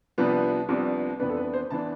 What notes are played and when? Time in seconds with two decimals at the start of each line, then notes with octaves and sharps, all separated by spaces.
0.18 C2 C3 F3 B3 D4 B4
0.69 C2 C3 F3 B3 D4
1.19 F2 E3 B3 D4 B4
1.29 A4
1.37 B4
1.54 C5
1.70 E3 B3 D4 A5